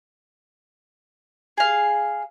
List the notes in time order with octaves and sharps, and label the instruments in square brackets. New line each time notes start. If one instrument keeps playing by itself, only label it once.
[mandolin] G#4 F5